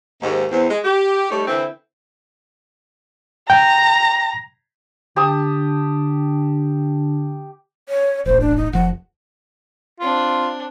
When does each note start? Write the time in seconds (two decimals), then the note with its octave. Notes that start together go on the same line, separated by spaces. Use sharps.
0.23 D#2 G#2
0.51 E2 C4
0.70 G#3
0.85 G4
1.31 G3 A3 D#4 G4 C#5
1.48 D3 E3 C4 E4
3.50 G5 A#5
5.16 D3 G4 A5 D#6
7.89 C#5
8.26 E1 A1 C5
8.41 D4
8.57 D#4
8.73 F1 F3 F#5
10.00 C4 D4 F4